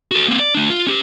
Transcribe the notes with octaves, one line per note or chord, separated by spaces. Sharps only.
F#4 A4
A#3 C4
D5
A3 D4
F4
C#4 G4